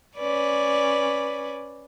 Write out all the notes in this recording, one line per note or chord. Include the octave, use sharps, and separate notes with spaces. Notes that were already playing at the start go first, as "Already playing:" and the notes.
C#4 B4 D5